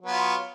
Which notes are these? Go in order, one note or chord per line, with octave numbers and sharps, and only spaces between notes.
F#3 B3 F4